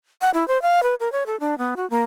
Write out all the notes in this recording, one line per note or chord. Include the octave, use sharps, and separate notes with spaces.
F#5
E4
C5
F5
B4
A#4
C#5
A4
D4
B3
F#4
A#3